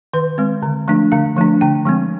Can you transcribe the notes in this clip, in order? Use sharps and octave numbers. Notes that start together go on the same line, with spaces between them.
D#3 B4
G#3 C4
D3
F3 A3 D4
D3 F5
F3 A3 D4
D3 G5
F3 G#3 C4